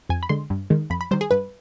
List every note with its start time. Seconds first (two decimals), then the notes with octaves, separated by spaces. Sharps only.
0.09 F2 G#5
0.23 B5
0.29 D3 G#3 C6
0.50 G2
0.70 D#3 G#3
0.90 F2 B5
1.01 B5
1.11 D#3 G3 C5
1.21 G#4
1.31 G2 B4